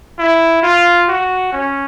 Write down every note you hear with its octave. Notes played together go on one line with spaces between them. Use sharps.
E4
F4
F#4
C#4